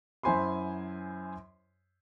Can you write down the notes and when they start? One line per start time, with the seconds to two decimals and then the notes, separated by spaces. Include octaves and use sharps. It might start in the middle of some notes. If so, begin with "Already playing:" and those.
0.23 F#2 E4 C5 G#5 B5 C6